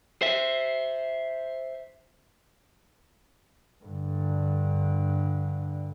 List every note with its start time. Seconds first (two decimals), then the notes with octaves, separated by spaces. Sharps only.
0.22 C5 E5
3.85 G2 D3